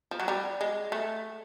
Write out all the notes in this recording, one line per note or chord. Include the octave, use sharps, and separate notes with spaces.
F3
F#3
G3
G#3
A3